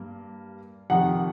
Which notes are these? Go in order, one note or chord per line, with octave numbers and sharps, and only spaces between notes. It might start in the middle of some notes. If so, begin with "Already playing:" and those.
Already playing: G2 A#3
F2 C3 D#3 F#5